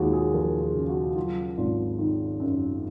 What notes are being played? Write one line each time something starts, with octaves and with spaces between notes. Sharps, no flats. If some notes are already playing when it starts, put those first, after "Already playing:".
Already playing: D#2 G#3 F4 F#4 G#4
G#4
F3 A#4
G#4
C#3
F#4
F#3 F4
G#1 F4
D#3
F#2